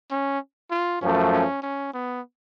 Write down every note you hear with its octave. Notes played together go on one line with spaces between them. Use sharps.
C#4
F4
F#2 F3 A3 C#4
C#4
C#4
B3